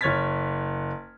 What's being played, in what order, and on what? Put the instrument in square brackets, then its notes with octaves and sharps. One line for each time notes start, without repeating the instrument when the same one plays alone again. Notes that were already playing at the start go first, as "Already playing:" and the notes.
[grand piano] F#1 C#5 F6 G#6 A6 B6